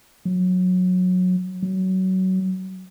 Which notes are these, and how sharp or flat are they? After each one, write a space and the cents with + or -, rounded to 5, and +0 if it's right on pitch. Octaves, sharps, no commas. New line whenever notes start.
F#3 -20
F#3 +20